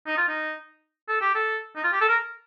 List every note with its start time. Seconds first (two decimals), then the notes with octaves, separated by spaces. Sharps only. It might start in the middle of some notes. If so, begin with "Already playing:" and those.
0.07 D#4
0.17 F4
0.28 D#4
1.08 A4
1.21 G4
1.35 A4
1.76 D#4
1.84 F4
1.93 G4
2.01 A4
2.09 A#4